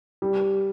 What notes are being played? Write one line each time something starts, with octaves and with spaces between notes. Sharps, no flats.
G3